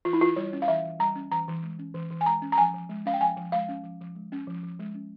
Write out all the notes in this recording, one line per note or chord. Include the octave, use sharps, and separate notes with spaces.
E3 F4
E4
E3 F4
G3 C#5
C#4
F5
E3 E5
E3
G3 A#5
C#4
E3 A#5
E3
G#3
C#4
E3
E3
G#5
G#3 A#5
C#4
A#5
F3 G#5
F3
G#3
C#4 F5
G5
F3 G#5
F3
G#3 F5
C#4
F3
F3
G#3
C#4
F3
F3
G#3
C#4